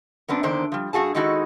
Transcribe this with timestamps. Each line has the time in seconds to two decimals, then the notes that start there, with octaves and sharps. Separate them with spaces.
0.28 F#2 B3 C4 D4
0.43 E2 D3 D#3 A#3 D4 C5
0.72 F3 G3
0.93 G2 C#3 F#4 G#4 A5
1.15 D#3 G#3 D#4 E4 F#4 A4